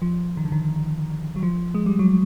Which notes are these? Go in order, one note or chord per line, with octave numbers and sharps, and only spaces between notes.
F3
D#3
D3
D#3
F#3
F3
G#3
G3
F#3